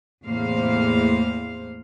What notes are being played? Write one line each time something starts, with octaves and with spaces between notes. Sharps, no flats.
E2 A2 C3 A#3 C5 F5